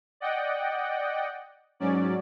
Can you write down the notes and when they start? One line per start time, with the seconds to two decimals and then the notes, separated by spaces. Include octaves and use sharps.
0.20 D5 D#5 F#5 G5
1.80 G#2 F#3 C#4 D5